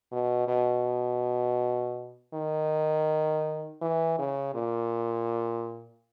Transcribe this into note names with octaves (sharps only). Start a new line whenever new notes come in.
B2
B2
D#3
E3
C#3
A#2